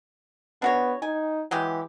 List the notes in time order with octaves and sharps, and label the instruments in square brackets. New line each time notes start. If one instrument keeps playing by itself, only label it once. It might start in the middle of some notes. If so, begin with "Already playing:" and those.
[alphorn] B3 [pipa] D4 F#4 C#5
[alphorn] D#4 [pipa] G#5
[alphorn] E3 [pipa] F#3 G#3 G4